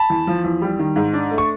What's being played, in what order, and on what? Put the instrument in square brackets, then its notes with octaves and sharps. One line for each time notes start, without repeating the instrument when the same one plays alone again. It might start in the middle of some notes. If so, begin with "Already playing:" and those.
Already playing: [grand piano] A5 B5
[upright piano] E2
F3
E2
G3
D#3
G#2
D4
A3
[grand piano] C#6